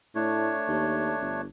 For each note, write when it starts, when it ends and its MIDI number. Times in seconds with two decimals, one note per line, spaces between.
0.15 0.51 45
0.15 1.41 57
0.15 1.41 62
0.15 1.41 73
0.68 1.13 39
1.22 1.46 31